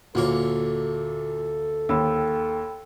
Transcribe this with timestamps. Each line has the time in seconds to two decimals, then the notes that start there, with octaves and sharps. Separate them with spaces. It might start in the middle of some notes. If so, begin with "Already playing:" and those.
0.15 D2 A#2 A#3 A4 C#5
1.89 D#2 G5 B5 E6